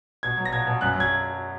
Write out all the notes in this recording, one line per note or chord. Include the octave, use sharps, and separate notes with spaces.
B2 G#6
F#3
A#6
B2 G#6
B2
F#2 F#6
F#3
G#6